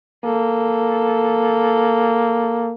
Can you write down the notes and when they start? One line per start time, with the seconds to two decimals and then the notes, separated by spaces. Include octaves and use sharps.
0.25 A#3 A4